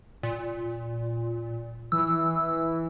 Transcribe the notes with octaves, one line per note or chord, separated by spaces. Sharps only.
A#2
E3 E6